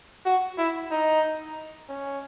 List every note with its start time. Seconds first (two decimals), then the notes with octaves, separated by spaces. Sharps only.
0.26 F#4
0.58 E4
0.91 D#4
1.89 C#4